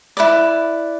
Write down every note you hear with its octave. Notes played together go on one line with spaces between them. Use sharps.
E4 B4 D5